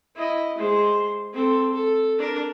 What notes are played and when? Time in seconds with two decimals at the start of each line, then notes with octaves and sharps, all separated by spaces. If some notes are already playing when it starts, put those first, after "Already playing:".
0.15 E4 D#5
0.57 G#3 C5
1.33 C4 A4
1.74 A4
2.19 D4 A#4